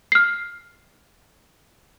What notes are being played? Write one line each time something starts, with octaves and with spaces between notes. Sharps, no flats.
F6 C7